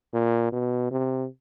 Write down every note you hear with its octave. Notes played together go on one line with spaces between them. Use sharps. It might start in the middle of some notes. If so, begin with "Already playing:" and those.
A#2
B2
C3